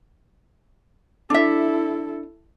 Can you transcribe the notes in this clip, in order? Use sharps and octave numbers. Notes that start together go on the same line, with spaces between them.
D4 E4 A4 E5